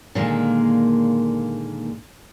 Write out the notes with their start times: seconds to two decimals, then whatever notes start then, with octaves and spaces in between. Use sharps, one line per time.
0.15 A#2 D3 D#3 G#3 A#3